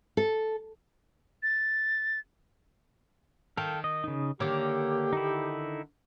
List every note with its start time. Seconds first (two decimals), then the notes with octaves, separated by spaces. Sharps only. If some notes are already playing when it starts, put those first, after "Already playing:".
0.17 A4
1.43 A6
3.57 D#3 A4 F5 G5
3.84 D#5
4.04 C#3 D#4
4.40 D3 D#3 A#3 G4 C#5 D6
5.13 D#4 E4